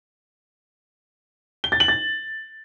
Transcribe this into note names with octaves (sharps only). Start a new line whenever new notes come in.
G7
A6
F#7
A6